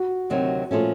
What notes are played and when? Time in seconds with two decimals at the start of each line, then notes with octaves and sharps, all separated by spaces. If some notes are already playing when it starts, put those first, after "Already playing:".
Already playing: F#4
0.30 D2 C3 D#3 F#3
0.71 A#2 F3 A3 C#4